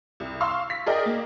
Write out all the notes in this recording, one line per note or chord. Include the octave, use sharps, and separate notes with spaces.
C2
F5 C6 C#6 E6
B6
G#4 A#4 D5 D#5 G5
A#3